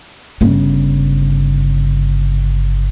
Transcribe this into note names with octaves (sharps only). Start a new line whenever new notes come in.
G1 C#3